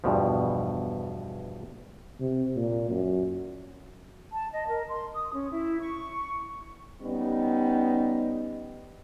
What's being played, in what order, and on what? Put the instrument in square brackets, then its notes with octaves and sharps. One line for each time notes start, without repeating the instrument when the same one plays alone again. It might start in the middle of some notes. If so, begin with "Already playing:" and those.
[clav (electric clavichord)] E2 G2 B2 F3
[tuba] C3
A#2
F#2
[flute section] A5
D#5
A#4
C6
D#6
C#4
E4
C#6
[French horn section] G3 B3 C#4 D#4